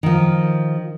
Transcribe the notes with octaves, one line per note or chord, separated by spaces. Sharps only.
D#3 F3